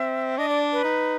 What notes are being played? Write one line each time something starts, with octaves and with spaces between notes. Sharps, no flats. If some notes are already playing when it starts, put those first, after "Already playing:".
Already playing: C4 E5
D4 D#5
D5
B4
D#4